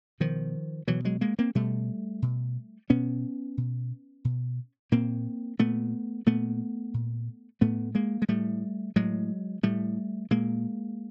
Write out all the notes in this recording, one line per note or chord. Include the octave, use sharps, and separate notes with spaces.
B2 D#3 F3
B2 E3 F#3
F#3 G#3
G#3 A#3
A#3 C4
B2 G3 A3
B2
B2 B3 C#4
B2
B2
A#2 A#3 C4
A#2 A3 B3
A#2 A3 B3
A#2
A2 A3 B3
G#3 A#3
G#3
A2 G3 A3
A2 F#3 G#3
A2 G3 A3
A#2 G#3 A#3